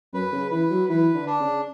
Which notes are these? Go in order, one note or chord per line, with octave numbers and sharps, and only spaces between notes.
F#2 B4
C#3
E3 B4
F#3
E3 B4
D3
D4
C#3